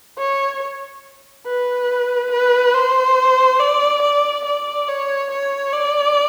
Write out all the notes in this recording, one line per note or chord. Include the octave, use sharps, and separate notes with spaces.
C#5
B4
B4
C5
D5
D5
D5
C#5
C#5
D5